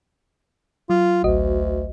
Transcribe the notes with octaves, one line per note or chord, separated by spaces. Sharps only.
F#3 F4
A1 D2 F#4 D#5